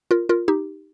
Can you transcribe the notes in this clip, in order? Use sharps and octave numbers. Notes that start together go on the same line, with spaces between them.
F4 A#4
F4 A#4
D#4 G4